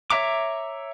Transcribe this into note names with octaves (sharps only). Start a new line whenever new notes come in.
C#5 E5 A#5 D6